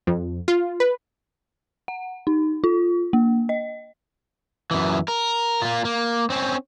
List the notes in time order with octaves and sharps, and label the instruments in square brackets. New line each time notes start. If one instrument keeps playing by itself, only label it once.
[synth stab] F2
F4
B4
[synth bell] F#5
D#4
F4
A#3
D#5
[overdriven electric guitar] F#2 E3
A#4
A#3 F4
A#3
C4 C#4